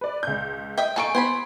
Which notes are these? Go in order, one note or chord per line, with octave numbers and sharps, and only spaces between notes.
B4 D5
C#2 G6
D#5 E5 G5
A#3 A4 G#5 C#6 D7
B3 C5 G#5 B5